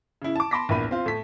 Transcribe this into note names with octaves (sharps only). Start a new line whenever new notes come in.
C#3 E4
A5 D6
A5 B5 C6 D6 A#6 B6
A#1 E2 A#3 B5 D#7
C4 F4
A2 B6